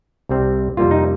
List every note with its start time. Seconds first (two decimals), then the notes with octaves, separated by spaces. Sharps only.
0.29 C2 C3 G3 C4
0.77 F2 C3 G3 A#3 F4
0.91 D#4